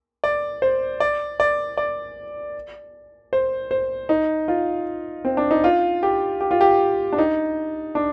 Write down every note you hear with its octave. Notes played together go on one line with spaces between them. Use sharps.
D5
C5
D5
D5
D5
C5
C5
D#4
F4
C4
D4
D#4
F4
G4
G4
F4
G4
D4
D#4
D4